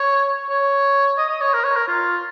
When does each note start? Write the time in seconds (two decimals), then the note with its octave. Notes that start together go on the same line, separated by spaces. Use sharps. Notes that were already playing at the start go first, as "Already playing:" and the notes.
Already playing: C#5
0.48 C#5
1.18 D#5
1.29 D#5
1.41 C#5
1.53 A#4
1.64 C#5
1.76 A#4
1.88 F4